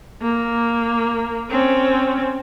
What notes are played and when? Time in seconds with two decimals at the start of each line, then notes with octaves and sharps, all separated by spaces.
0.22 A#3
1.50 C4 C#4